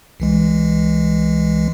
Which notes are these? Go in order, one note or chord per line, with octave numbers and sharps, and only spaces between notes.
C2 E3 G#3